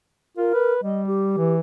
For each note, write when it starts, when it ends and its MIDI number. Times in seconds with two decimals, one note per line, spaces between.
0.37 0.49 65
0.37 0.73 70
0.54 0.82 71
0.83 1.33 55
0.83 1.05 75
1.07 1.55 67
1.37 1.60 52